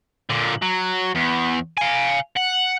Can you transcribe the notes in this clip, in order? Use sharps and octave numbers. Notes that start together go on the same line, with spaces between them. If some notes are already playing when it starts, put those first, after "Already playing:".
A#2 D3
F#3
E2
F5 G#5
F#5